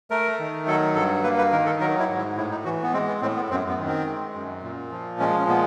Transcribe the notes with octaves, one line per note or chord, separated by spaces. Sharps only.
A3 A#4
D#3
F#3 A4
G2 A4
A#3 B4
B4
D#3 A#4
A4
F#3 A#4
E4
G#2
E4
A2 E4
D#4
E3 F#4
B3
G#3 C4
B3
A2 C4
B3
F#2 C4
B3
D#3
C4
G#3
F#2
A#2
F3
G#3 C#4
C#4
A#2 B3